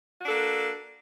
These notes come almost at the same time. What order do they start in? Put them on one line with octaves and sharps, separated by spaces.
F#4 D4 A4 A#3